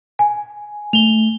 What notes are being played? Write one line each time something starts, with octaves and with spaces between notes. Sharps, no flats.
G#5
A3 F7 G7